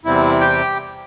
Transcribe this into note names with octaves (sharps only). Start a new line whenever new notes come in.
E2 C3 G3 C4 E4
G4 G5